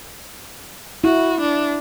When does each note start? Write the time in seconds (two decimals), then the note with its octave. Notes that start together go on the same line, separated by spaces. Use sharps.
1.04 E4 F#4
1.41 D4